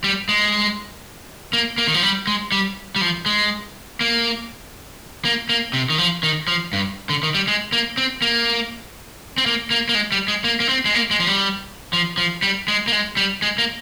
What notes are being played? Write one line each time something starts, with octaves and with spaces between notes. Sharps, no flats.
G3
G#3
A#3
A#3
D#3
F3
G3
G#3
G3
G3
F3
G#3
A#3
A#3
A#3
C3
D#3
F3
D#3
F3
G2
D3
D#3
G3
G#3
A#3
C4
A#3
C4
A#3
A#3
A#3
G#3
G3
G#3
A#3
A#3
C4
G#3
A#3
G#3
F3
G3
F3
F3
G3
G#3
A#3
G#3
G3
G#3
A#3